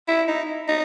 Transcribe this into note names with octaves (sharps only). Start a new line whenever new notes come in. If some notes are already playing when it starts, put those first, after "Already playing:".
E4
D#4
D#4